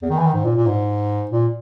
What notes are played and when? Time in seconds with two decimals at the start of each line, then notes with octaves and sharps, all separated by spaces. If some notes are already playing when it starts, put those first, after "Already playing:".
0.02 E2
0.10 D#3
0.18 E3
0.26 D#3
0.34 G#2
0.45 A#2
0.56 A#2
0.66 G#2
1.31 A#2